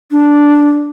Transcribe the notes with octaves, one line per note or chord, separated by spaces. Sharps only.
D4